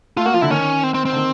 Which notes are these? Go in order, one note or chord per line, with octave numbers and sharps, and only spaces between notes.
A3 F4
A#3 F#4
F3 F4
D3 E4
D#3 C#4
C4
C4
C4
D3
D#3